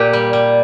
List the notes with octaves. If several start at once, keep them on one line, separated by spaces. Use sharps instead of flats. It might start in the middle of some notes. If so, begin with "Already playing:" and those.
Already playing: A#2 G4
G3
G3